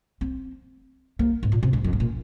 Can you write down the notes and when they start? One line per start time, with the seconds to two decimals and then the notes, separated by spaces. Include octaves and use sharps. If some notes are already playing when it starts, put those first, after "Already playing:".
0.21 C4
1.19 A#3
1.43 G#2
1.52 A#2
1.63 C3
1.73 G#2
1.84 F2
1.93 G#2
2.00 A#2